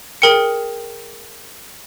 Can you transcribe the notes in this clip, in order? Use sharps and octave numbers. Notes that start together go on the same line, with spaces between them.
G#4 A#4 G5 C#7